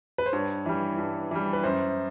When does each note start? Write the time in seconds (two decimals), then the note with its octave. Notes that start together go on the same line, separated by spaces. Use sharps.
0.18 B4
0.26 C5
0.33 G2 C#5
0.66 E3 G3
0.98 G2
1.31 E3 G3
1.53 B4
1.63 F#2 C5